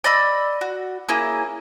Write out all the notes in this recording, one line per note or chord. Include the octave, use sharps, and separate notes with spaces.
D5 D#5 B5 E6
F#4
A#3 C#4 E4 G#4